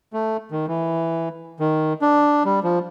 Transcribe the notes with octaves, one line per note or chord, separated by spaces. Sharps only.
A3
D#3
E3
D#3
D4
G3
F3